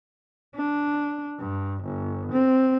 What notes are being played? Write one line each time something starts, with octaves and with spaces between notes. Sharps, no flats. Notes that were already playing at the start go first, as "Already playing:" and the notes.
D4
G2
G1
C4